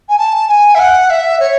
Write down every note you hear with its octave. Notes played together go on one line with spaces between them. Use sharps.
G#5
A5
G#5
E5
F#5
E5
C#5